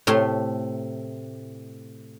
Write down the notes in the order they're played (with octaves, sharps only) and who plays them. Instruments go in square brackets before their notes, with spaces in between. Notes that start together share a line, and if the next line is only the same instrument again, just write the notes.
[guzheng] A2 C3 A3 C6